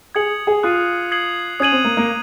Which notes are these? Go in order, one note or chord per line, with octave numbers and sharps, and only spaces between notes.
G#4 D#6 G#6 C#7 F#7
G#4
F4 D#6 F#6 C7 D#7
D#6 G#6 C7 F#7
C#4 D#6 G#6 D#7 F#7
C4
A#3
A#3